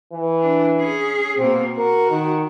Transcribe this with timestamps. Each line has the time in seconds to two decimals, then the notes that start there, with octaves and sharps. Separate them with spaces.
0.13 E3
0.42 D4
0.77 C#4 G#4
1.38 B2 A#3 C4
1.78 F#4 A#4
2.10 D#3